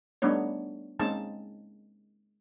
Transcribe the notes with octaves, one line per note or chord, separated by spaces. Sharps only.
G3 A3 B3 D4 D#4 C#5
G#3 A#3 C4 C#4 D#4 A5